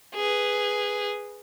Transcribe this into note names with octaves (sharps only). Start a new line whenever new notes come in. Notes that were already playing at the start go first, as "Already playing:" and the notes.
G#4 B4